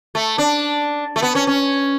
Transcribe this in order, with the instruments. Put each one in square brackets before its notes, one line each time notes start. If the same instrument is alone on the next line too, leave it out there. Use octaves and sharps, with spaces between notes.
[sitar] A3
D4
A3
B3
C#4
C#4